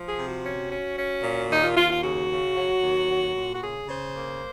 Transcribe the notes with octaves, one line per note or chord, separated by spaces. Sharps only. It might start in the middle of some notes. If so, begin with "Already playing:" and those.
Already playing: F3
G#4
C3
F#4
C#4
C#4
C#4
A#2
D#2 D#4
F4
D#2 F4
F4
C#3 F#4
C#3
F#3
D#2
F#3
A#2
F#4
C#3 G#4
C#3 C5
A#3